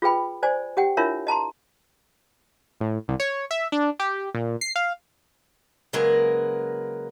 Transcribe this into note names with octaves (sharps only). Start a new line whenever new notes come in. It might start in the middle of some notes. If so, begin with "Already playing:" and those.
F4 G#4 B4 G5 B5
C5 D5 G#5
G4 F#5 G5
D4 E4 F4 A#4 C#5 E5
D#5 A5 A#5 C6
A2
C2
C#5
E5
D4
G4
A#2
C7
F5
C#3 F#3 G#3 A#3 A#4 B4